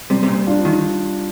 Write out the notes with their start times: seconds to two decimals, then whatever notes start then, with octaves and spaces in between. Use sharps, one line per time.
0.10 C3 G3
0.23 C3
0.28 A#2
0.47 D4 F4
0.65 D#3